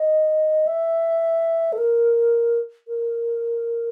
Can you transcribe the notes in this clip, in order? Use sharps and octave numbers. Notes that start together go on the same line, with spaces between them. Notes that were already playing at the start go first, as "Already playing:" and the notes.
Already playing: D#5
E5
A4
A#4
A#4